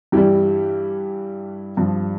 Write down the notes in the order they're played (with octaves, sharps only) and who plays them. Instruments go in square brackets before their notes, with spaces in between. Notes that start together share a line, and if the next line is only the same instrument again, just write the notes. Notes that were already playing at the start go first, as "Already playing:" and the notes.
[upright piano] G2 E3 G3 E4 G4
G2 F3